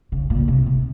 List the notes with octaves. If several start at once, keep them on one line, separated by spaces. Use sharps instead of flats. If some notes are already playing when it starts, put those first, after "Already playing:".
C#3
A#2
C3
C3